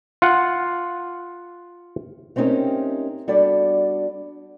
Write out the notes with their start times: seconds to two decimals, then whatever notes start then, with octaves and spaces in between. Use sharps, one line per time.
0.22 F4 F#5
2.36 A3 C4 C#4 D#4 G4 A#4
3.28 G3 B3 D4 F#4 A4 D5